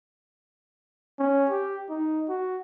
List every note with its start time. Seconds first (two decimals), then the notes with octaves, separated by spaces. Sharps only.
1.19 C#4
1.50 G4
1.90 D#4
2.29 F#4